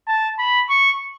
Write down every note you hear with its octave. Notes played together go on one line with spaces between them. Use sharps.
A5
B5
C#6